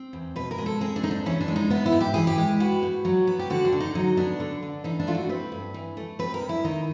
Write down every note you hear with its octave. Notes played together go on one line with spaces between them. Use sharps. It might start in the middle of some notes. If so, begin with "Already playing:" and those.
Already playing: C4
E2
B2 B4
A#4
G#3
A4
C4 G#4
D4
E2 D#4
D4
E3 C#4
D4
G#3
D#4
B3 E4
E4
G#2
G4
E3 G#4
G4
G#3
B3 F#4
G#2
F#3
B3
G4
D3 F#4
D4
D3
D#4
F#3 D#4
B3 D4
D3
D3
E3 D#4
D4
A3 F4
F#4
C4 B4
G2
E3
A3
C4 B4
A#4
G2
E4
D#3 D#4